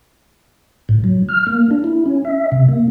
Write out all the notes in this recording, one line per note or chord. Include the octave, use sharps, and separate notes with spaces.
A2
F#3
F6
A#3
D4
E4
C#4
E5
C3
A#3